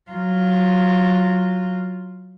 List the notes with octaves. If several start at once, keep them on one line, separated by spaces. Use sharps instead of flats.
F#3 F4